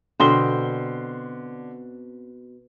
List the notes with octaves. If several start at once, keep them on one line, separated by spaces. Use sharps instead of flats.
B2 D3 C4 C5 C6 G7